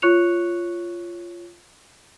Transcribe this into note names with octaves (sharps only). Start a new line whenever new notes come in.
F4 C#5 C#6 F#6 C#7 F7